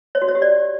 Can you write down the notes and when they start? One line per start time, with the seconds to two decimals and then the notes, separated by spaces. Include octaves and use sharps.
0.15 C#5
0.22 F#4
0.28 C#5
0.35 G4
0.42 D5